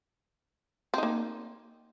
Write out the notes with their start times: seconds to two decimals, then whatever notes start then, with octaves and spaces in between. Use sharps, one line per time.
0.94 C4
0.98 D#4
1.03 A#3